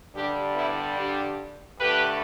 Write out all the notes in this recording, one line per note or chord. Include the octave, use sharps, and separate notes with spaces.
G2 D3 G3 D4 G4
B3 E4
D4 G4
G2 D3 A3 G4 B4